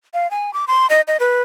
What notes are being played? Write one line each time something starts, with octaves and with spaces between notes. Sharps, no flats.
F5
G#5
D6
C6
D#5
D#5
B4